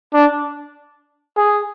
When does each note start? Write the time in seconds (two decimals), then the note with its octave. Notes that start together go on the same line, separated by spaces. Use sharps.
0.13 D4
1.37 G#4